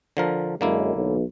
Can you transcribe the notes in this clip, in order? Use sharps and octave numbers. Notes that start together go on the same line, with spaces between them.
D3 F3 A#4
F#2 D3 G#3 A#3 E4
B1